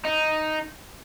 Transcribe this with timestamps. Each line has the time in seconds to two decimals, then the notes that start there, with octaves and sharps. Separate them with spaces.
0.05 D#4